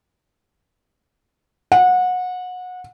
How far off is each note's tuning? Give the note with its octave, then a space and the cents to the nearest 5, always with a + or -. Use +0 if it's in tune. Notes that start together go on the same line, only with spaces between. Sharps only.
F#5 -25